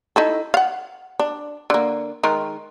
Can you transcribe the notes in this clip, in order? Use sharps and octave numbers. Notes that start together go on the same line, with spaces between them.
D#4 E4 A4
F5 F#5
D4
D3 A#3
D#3 G#3 A#4